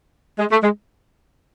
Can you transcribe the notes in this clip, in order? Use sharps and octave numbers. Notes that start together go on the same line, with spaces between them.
G#3
A3
G#3